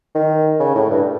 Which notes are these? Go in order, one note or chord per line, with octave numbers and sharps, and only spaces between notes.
D#3
C#3
A2
G2